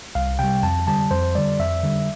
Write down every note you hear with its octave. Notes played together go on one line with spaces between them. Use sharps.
C2 F5
C3 G3 G5
F2 A5
D3 G3 A5
F2 C5
D3 G3 D5
F2 E5
D3 G3